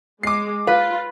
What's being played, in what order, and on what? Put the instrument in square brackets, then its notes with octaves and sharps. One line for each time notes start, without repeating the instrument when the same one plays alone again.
[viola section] G#3 [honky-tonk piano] D6 C7
[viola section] F4 [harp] B4 [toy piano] F5